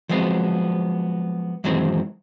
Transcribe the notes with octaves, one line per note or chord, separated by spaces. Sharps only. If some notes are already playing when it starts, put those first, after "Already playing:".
F3 F#3 G#3 B3 C4
F#2 D#3 E3 F#3 G#3 C4